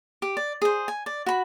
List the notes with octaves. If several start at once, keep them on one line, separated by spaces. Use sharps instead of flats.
G4
D5
G#4 C5
G#5
D5
F#4 B5